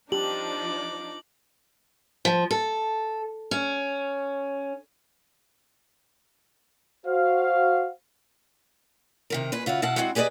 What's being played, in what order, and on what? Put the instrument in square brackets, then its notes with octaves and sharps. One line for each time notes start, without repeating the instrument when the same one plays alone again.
[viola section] F3 D4 [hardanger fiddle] D#4 D6 [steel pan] G4 [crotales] F#7
[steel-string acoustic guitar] F3
A4
C#4
[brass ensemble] F#4 C5 F5
[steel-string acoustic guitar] C3 D#3 A#4
A#2 G#3 B4
C#3 F4 F#4 E5
B2 E4 F5 F#5 A5
G#3 A#3 C4 D4 E4 F#4
G4 G#4 B4 C5 D5 D#5